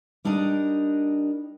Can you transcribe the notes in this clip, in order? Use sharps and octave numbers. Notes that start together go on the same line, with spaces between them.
G3 D4 D#4 A#4 D#5